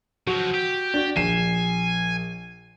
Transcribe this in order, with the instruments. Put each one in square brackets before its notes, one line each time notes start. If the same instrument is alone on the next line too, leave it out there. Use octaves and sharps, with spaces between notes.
[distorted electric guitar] F3 F#3 [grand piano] F#4
[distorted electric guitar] G4
[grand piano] D4 F#4
[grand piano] A#1 C7 E7 [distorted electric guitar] G#5